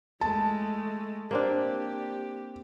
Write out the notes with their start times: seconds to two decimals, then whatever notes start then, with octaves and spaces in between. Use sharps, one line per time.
0.21 G#3 A3 A5
1.31 A#3 C4 D4 G4